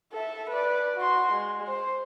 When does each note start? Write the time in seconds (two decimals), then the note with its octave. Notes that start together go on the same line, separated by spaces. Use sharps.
0.13 A4 E5
0.50 B4 D5
0.96 F#4 C6
1.32 G#3
1.67 C5